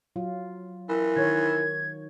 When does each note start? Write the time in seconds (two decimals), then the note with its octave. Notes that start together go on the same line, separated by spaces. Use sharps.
0.16 F#3 F4
0.89 E3 A#4
1.16 D#3 C#5 G#6